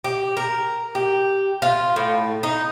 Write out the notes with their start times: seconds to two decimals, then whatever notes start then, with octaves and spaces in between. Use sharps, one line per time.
0.04 G4
0.37 A#4
0.95 G4
1.62 F4
1.96 A2
2.43 D#4